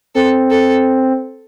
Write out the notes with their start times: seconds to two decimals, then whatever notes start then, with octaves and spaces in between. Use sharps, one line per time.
0.15 C4 A4
0.50 A4